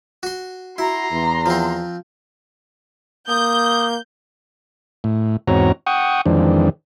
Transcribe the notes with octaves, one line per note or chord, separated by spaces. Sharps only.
F#4 C6
E4 F#4 A#5 C6
E2
F3 C4
A#3 D#6 G6
A2
E2 G#2 C4 F#4 C#5 A#5
F#5 G5 C#6 D#6
F2 D#3 E3 G#3 C4 D4